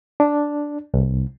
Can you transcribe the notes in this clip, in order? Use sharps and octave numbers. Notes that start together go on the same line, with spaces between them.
D4
C2